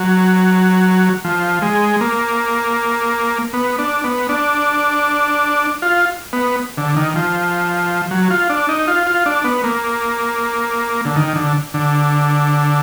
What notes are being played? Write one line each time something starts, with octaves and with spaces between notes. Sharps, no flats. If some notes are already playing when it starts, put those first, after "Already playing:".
Already playing: F#3
F3
G#3
A#3
B3
D4
B3
D4
F4
B3
D3
D#3
F3
F#3
F4
D4
D#4
F4
F4
D4
B3
A#3
D3
D#3
D3
D3